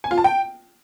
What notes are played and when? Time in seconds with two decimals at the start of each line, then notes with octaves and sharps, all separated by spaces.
0.04 G#5
0.11 F4
0.18 A5
0.24 G5